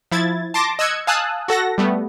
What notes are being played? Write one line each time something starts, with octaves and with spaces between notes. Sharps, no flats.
F3 E4 G#6 A6
A5 C6 D6 A#6
D#5 E6 F#6 G#6 C#7
F5 G#5 A5 D#6 E6 F#6
F#4 A4 F#5 A#6
G3 A3 B3